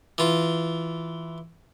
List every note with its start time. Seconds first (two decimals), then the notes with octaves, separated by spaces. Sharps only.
0.18 E3 F4